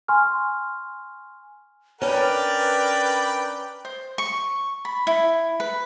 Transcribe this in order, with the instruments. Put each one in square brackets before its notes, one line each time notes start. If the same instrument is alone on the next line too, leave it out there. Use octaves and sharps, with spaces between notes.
[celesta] G#5 C6 C#6 F6
[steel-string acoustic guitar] C#4 D4 [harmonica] A#4 G5 B5 [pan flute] B4 [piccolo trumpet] D5
[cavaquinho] C5
C#6
B5
E4
B4